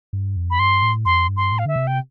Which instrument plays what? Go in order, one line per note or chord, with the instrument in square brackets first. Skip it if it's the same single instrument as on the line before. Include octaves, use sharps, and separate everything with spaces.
[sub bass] G2
F2
[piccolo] B5
[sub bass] G2 [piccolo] C6
[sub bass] A2
[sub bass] F2 [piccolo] C6
[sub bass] G2
[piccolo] C6
[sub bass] A2
[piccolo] F5
[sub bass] D3 [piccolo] E5
[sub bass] C3
[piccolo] G5